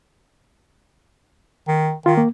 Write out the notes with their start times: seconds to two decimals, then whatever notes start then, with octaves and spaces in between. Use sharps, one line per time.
1.68 D#3
2.06 D#3 F4
2.18 A#3